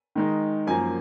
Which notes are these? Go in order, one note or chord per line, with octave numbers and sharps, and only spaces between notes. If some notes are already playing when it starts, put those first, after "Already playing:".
D#3 G#3 D#4
F#2 F3 A#3 G#5